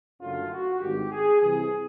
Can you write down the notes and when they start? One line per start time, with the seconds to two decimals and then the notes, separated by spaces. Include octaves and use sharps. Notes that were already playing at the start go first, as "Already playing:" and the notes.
0.21 F#1 F#2 D3 F#3 A3 F4
0.51 F#4
0.80 G#1 G2 D#3 G4
1.11 G#4
1.40 C2 C3 E3 G#4